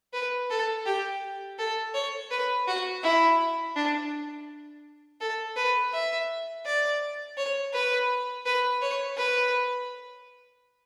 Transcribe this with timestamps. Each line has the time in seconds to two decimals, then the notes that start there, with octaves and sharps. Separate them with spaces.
0.13 B4
0.50 A4
0.86 G4
1.59 A4
1.94 C#5
2.31 B4
2.67 F#4
3.03 E4
3.76 D4
5.20 A4
5.56 B4
5.93 E5
6.66 D5
7.37 C#5
7.73 B4
8.46 B4
8.82 C#5
9.18 B4